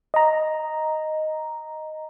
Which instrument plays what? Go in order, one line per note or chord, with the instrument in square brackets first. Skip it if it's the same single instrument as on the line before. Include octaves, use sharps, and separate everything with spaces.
[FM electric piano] D#5 A#5